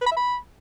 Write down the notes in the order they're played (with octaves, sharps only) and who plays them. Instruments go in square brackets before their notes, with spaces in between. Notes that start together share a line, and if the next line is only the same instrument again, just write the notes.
[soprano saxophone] B4
B5
E5
B5